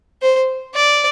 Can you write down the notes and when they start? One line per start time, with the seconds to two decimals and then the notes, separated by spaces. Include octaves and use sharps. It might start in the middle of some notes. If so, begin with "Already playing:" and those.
0.22 C5
0.75 D5